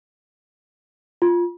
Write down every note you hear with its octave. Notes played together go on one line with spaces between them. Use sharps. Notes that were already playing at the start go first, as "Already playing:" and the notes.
F4